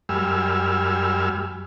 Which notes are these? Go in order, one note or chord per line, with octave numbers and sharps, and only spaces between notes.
F#2 G3 G#5 E6 F6